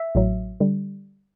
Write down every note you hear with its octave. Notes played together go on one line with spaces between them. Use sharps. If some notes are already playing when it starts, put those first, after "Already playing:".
Already playing: E5
A1 A2 F#3
D3 G3